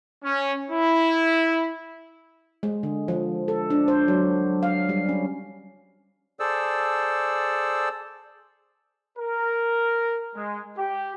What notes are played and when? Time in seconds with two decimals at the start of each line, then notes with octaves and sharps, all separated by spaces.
0.24 C#4
0.71 E4
2.63 G#3
2.83 D3
3.08 F3
3.48 A4
3.70 D4
3.88 C5
4.08 F#3
4.63 F5
4.89 G3
5.09 C#4
6.40 G#4 A4 C5 D5 E6
9.17 A#4
10.34 G#3
10.76 G4